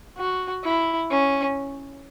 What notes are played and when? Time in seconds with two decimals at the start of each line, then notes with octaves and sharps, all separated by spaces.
0.17 F#4
0.64 E4
1.10 C#4